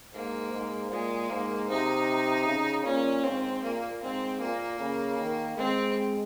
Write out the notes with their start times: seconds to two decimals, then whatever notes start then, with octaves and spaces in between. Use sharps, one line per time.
0.14 G#2 A#3
0.53 G#2
0.91 A#2 G#3
1.30 G#2 A#3
1.69 C3 D#4
2.47 C#3
2.85 A#2 C#4
3.24 G#2 C4
3.63 A#2 A#3
4.02 G#2 C4
4.41 A#2 A#3
4.80 C#3
5.18 D#3
5.57 G#3 C4